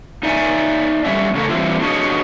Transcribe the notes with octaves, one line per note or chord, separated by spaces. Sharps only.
D#4 D5 E5 G#5
G3 C#4 E5
C#3 A3 C#4 A#4
E3 G3 C4 D4 E4 F4
D4 F#4 G#4 C#5 D#5